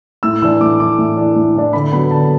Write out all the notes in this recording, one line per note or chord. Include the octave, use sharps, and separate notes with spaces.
A2 E6
E3 D4 E6
A2 D6
E3 D4 D6
A2
E3 D4
A2
E3 D4
D3 B5
F#3 B3 B5
D3 A5